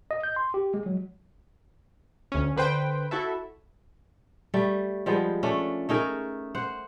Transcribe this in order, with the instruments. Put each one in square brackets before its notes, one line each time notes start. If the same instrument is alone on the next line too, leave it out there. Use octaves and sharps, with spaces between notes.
[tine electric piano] D#5
G6
C6
G4
G#3
F#3
[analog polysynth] D2 C#4
D3 B4 C5 G5
E4 F#4 A4 E5
[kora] G3 A3
F3 G3 G#3 B3
A3 C#4 D4
A3 D#4 G#4 A#4
C5 F#5